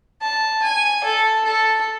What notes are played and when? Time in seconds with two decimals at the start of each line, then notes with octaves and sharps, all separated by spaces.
0.22 A5
0.62 G#5
1.04 A4
1.45 A4